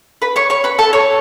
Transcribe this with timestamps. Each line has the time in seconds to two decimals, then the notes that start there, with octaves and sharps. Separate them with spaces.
0.22 B4 B5
0.36 C#5 C#6
0.50 C#5 C#6
0.64 B4 B5
0.79 A4 A5
0.93 C#5 C#6